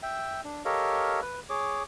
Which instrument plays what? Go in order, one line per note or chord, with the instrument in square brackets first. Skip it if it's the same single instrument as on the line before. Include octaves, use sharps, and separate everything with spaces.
[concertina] E5 G5
D4
G4 A4 A#4 C#5 D#5 F5
B4
G#4 C#5 D6